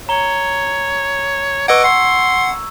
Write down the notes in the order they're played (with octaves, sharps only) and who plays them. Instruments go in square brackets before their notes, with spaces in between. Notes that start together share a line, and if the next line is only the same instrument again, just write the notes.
[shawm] C#5 [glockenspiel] A#5 G7
[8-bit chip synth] B4 D#5 F#5 [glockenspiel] C#6 E6 G#6 [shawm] D6
[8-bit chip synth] F#5 [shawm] C6